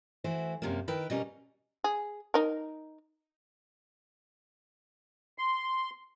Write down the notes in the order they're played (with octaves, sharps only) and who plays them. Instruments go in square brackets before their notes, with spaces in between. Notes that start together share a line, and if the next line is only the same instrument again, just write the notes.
[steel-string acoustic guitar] E3 A3 E4 F#4 C5
F#2 C3 A#3
D#3 E4 A#4 B4 G5
B2 G3 C#4 A#4
[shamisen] G#4
D#4 A#4
[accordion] C6